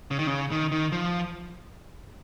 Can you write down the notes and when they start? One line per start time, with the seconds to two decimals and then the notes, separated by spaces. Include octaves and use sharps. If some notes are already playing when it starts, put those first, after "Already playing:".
0.11 C#3
0.19 D#3
0.27 C#3
0.51 D#3
0.72 D#3
0.92 F3